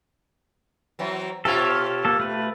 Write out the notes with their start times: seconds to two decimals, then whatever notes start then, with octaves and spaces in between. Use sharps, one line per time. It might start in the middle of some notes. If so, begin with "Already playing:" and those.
0.99 E3 F#3 C4
1.45 B2 F4 G4 A4 C#5
2.05 A#3 A4
2.20 A3 B4